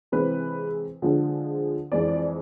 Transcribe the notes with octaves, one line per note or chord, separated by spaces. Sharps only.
C3 E3 G#3 C4 B4
D3 F3 G#3
F2 E3 G#3 D5